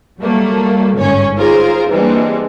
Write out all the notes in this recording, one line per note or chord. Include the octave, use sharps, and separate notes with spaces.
F#3 G3 A3 A#3
G1 G#2 C#4 C#5
D#4 F4 G#4 A#4 C5
E3 G3 G#3 A#3 C4 D4